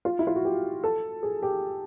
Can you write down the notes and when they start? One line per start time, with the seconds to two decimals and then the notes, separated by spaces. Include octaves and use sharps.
0.05 F4
0.19 E4
0.27 F4
0.36 F#4
0.45 G4
0.84 A4
1.23 G#4
1.42 G4